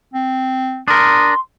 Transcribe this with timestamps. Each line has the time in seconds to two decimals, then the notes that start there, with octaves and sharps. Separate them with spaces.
0.14 C4
0.88 D4 A#4 C6 D#6